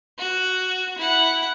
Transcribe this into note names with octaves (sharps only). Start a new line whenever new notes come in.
F#4
E4 F#5